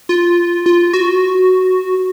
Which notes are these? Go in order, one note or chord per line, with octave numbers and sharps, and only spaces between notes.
F4
F4
F#4